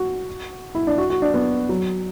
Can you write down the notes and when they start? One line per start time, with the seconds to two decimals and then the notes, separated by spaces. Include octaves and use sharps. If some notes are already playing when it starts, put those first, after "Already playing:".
Already playing: F#4
0.75 E4
0.87 D4
0.98 F#4
1.10 F#4
1.22 D4
1.34 B3
1.69 F#3